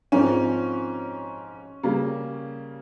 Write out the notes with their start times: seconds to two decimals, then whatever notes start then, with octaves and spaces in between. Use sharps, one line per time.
0.12 G#2 F3 C4 C#4
1.83 C#3 G3 A#3